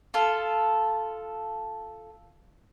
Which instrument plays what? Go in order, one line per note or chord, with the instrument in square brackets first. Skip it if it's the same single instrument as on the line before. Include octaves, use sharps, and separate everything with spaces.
[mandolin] F4 A4